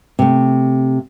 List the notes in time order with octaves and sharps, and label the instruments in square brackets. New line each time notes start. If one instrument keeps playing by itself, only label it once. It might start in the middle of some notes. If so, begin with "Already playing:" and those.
[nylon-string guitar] C3 A3